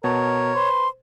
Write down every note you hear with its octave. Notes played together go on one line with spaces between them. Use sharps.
B2 A#4 C#5 A5
B4 C5 C6